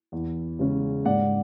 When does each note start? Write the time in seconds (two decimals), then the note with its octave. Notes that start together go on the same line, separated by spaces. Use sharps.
0.12 E2
0.59 C#3 G#3 C#4
1.05 G#2 D5 F#5